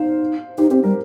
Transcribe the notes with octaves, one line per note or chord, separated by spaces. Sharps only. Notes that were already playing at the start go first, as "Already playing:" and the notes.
Already playing: D#4 C5 F5
D#4 G4 C5
C4 G4 C5
G3 A#4